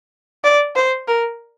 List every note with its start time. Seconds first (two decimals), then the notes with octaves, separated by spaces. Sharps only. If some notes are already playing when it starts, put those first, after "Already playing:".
0.44 D5
0.76 C5
1.08 A#4